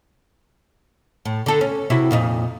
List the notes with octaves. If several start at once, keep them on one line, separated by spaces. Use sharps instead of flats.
A2
D3 A4
C#4
C3 E4 F#4
F2 A#2 D#4